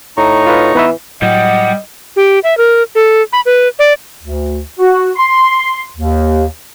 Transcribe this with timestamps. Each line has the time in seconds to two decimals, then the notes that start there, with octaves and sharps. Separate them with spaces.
0.17 A2 D#4 A#5 C#6
0.47 F4 B4
0.75 E3 B3 B4 E5
1.22 A2 F#3 G3 D#5 F#5
2.16 G4
2.44 E5
2.58 A#4
2.95 A4
3.33 B5
3.46 B4
3.79 D5
4.23 D2
4.79 F#4
5.16 C6
5.97 D#2